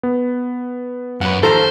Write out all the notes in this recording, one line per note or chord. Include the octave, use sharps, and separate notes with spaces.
B3
F#2 B4 F#5
D#2 F3 A4 C5 A#5